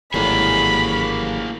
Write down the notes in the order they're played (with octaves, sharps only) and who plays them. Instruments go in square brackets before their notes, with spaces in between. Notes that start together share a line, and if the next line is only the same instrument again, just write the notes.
[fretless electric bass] G#1 A2 [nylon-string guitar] E3 F#3 G3 [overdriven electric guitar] A#3 G#4 [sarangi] B5